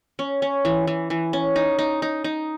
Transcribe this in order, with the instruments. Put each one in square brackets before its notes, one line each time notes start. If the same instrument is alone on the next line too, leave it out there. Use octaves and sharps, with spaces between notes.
[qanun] C#4
C#4
E3
E3
E3
C#4
D#4
D#4
D#4
D#4